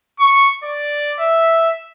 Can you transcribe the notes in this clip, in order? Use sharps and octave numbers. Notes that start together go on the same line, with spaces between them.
C#6
D5
E5